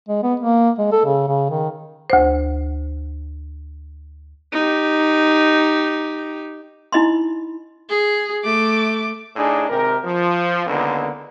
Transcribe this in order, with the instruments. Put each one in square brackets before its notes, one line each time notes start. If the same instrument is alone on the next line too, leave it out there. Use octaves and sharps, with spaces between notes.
[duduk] G#3
B3
A#3
G#3
A4
C#3
C#3
D#3
[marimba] D2 C5
[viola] D#4 G4
[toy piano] D#4 E4 D#5 B5 C6
[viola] G#4
A3 D6
[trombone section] A2 D4 D#4 G#4
G#1 C3 G4 A#4
F3
C#2 D3 D#3 A#3 B3